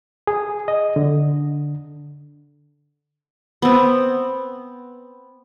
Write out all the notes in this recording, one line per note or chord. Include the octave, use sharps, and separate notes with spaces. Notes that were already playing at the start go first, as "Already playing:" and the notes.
G#4
D#5
D3
B3 C4